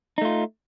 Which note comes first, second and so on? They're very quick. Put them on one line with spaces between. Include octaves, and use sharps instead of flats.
D#4 A3 F4